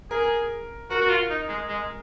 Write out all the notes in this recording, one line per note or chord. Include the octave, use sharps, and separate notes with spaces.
G#4 A#4
F#4 A#4
F#4
F4
D#4
G#3
G#3